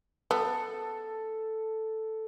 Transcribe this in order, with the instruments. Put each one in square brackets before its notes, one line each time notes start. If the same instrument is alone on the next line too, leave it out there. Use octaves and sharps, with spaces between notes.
[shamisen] B3 [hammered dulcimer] A4